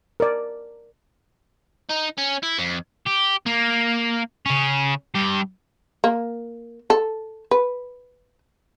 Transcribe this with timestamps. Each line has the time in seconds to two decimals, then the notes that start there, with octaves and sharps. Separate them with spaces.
0.20 A#4 D5
1.90 D#4
2.18 C#4
2.43 E4
2.58 F2
3.06 G4
3.46 A#3
4.46 C#3 C#4
5.15 G2 G4
6.04 A#3
6.90 A4
7.51 B4